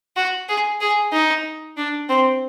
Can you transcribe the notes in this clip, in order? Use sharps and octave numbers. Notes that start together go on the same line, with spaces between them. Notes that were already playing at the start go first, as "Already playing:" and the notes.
F#4
G#4
G#4
D#4
D4
C4